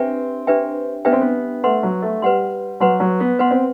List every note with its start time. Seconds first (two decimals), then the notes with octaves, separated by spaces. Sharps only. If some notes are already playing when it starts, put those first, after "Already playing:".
Already playing: C4 D4 G4 B4 E5 G5
0.47 D4 G4 B4 E5 G5
1.05 B3 D4 G4 B4 E5 G5
1.12 C4
1.21 B3
1.64 A3 B4 F#5 C6
1.83 F#3
2.02 A3
2.22 G3 B4 F#5 C6
2.80 F#3 B4 F#5 C6
3.00 F#3
3.20 B3
3.39 B3 B4 F#5 C6
3.51 C4